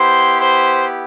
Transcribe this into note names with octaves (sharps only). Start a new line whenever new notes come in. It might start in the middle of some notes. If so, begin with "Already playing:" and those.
Already playing: B3 E4 G4 C5 C6
C5 C6